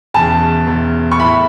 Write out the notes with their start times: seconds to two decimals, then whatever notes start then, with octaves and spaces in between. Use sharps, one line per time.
0.14 E1 E2 C#3 A5
0.66 E1 E2 C#3
1.11 C#6
1.18 A2 A3 E4 B5